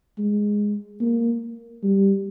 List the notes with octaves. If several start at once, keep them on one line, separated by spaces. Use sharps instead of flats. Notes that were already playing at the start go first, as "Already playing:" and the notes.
G#3
A#3
G3